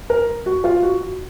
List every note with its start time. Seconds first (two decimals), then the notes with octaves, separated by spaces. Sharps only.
0.10 A#4
0.46 F#4
0.64 F4
0.83 F#4